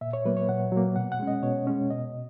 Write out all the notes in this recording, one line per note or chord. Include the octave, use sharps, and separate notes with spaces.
A#2 E5
C#5
F#3 A#3 B4
C#5
A#2 F#5
F#3 A#3
B2 F#5
F#5
G#3 C#4
D#5
B2 C#5
G#3 C#4
B2 D#5